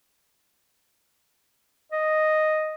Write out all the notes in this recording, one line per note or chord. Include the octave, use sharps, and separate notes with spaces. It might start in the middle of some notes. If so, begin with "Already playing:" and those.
D#5